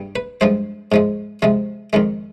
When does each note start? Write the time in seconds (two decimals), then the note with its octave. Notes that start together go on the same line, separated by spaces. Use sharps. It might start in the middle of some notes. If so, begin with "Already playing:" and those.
Already playing: G2 G3
0.16 B4
0.41 G2 F3 G#3 C5
0.92 G#2 F3 G#3
1.42 C3 F3 G#3
1.93 F2 D#3 G#3